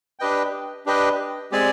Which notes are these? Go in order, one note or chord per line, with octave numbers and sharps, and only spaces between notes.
D4 G4 B4 D#5 G5
D4 G4 B4 D#5 G5
G#3 C4 G4 D5 G#5